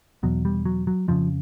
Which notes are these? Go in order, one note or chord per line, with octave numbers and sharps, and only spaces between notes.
E2 B2 F#3
G3
F#3
F#3
F2 C#3 F3